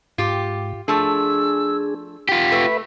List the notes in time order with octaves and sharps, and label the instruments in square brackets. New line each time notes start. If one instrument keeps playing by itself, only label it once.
[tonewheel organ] G#2 [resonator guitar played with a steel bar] F4 G4
[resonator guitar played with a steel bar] F3 A3 [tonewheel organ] D4 G#4 [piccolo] E6
[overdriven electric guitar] F4 G4 [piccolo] B6
[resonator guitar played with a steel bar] A3 [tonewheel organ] B4 E5 B5